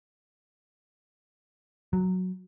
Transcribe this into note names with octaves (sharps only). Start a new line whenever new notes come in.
F#3